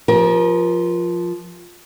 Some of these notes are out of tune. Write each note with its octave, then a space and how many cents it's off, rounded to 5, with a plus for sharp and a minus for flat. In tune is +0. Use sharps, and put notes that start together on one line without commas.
F3 +0 G4 +0 A#4 +35